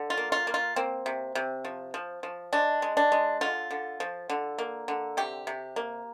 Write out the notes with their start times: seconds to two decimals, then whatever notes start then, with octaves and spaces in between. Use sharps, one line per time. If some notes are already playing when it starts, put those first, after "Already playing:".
Already playing: D3
0.10 F4
0.18 A#3
0.32 F4
0.47 A#3
0.54 F4
0.76 A#3 C4
1.06 C3
1.35 C3
1.65 F3
1.94 F3
2.23 F3
2.53 G#3 D4
2.82 G#3
2.97 D4
3.12 G#3
3.41 D3 F4
3.71 D3
4.00 F3
4.30 D3
4.59 A#3
4.88 D3
5.17 C3 G4
5.47 C3
5.76 A#3